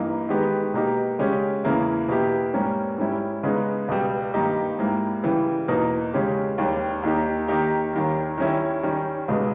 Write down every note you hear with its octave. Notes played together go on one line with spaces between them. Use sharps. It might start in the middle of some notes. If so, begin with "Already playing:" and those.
Already playing: G2 E3 A#3 D#4
D#3 G#3 B3 G4
B2 A#3 D#4 G4
C#3 G#3 C#4 G4
E2 C#3 E3 A#3 E4
B2 A#3 E4 G4
G#2 G3 A#3 C#4
G#2 G3 C#4 E4
C#3 G#3 B3 D#4
C#2 B2 G3
G2 D#3 A#3 D#4 G4
G#2 G3 A#3 E4
C#3 E3 G3
E2 B2 A#3 D#4
C#3 G#3 C#4 G4
D#2 D#3 G3
D#2 D#3 A#3 D#4 G4
D#3 A#3 D#4 G4
D#2 D#3 G3 A#3
D#3 G3 C#4 E4
D#3 G3 C#4
C#2 B2 G#3